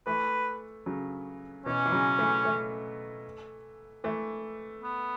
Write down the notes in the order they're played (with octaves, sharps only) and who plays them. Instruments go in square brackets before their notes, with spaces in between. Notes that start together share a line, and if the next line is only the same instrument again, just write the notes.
[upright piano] E3 A3 [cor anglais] B4
[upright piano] C#3 F#3
[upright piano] B2 E3 [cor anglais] C#4
[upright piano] E3
C#3 F#3
E3 A3
E3 A3
E3 A3
[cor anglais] B3